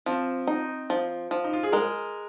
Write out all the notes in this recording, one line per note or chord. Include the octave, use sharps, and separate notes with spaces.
F3 C4
D#4
F3
F3
D#4
F4
G#4
G#3 A#4